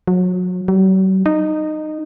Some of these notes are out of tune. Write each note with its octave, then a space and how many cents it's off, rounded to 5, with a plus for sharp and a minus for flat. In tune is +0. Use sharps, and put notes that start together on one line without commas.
F#3 -30
F#3 +45
D#4 -15